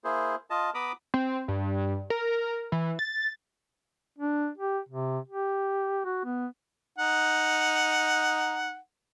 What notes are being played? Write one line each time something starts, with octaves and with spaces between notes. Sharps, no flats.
A#3 E4 G#4 C5
F4 D#5 A5
B3 A#5 B5 D6 D#6
C4
G2
A#4
E3
A6
D4
G4
C3
G4
F#4
B3
D#4 F#5